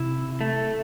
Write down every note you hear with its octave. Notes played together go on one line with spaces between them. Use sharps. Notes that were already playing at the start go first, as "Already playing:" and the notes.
Already playing: C3 E4
A3